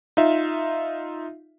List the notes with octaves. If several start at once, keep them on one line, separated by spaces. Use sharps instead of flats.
D#4 F4 E5